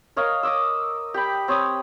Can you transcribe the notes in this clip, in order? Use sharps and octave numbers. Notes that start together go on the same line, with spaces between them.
A#4 C#5 D#5 F5
D#5 D6 E6
G4 G5 B5
C4 C#5 B5 D#6